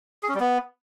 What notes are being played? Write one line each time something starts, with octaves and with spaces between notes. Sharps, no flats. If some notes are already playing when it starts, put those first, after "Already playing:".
G#4
C#4
G3
B3